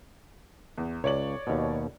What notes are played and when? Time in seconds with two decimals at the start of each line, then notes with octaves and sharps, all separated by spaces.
0.78 E2
1.04 C#2 C#5 D5 F#7
1.47 D#2 B2